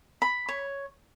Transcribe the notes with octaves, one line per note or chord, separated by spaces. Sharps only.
B5
C#5